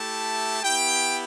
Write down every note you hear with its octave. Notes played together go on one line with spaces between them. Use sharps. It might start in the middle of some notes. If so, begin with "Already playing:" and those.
Already playing: A3 E4 G4 A5
B3 E4 G4 G5